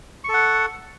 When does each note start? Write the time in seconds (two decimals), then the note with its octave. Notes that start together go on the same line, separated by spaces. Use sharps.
0.24 C#6
0.29 A4
0.34 F#5